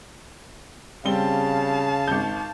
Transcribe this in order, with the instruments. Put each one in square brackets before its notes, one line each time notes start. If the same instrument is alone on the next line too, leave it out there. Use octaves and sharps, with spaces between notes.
[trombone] C#3 [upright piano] G3 C4 G7 [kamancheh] F5 A5
[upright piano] G#1 G6